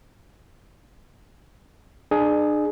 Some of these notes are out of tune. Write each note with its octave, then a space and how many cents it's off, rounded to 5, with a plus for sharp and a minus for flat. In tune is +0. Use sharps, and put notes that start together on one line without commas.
D4 +40 G#4 +15